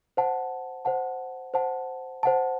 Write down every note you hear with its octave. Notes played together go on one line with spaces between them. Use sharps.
C5 F#5 A5
C5 F#5 A5
C5 F#5 A5
C5 F#5 A5